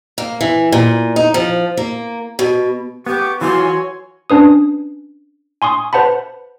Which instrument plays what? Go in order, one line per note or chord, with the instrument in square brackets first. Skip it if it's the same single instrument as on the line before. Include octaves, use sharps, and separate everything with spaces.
[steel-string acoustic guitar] A#3
E3
A#2
D#4
F3
A#3
B2
[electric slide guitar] B3 [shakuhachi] G4 [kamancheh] C#6 D6
[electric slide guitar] E3 F#3 F4 [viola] F#4 [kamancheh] C#5 G#5 [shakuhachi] C6
[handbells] C#4 D4 B4 D#6
G#5 C6 C#6 D#6
B4 C5 F#5 A5 B5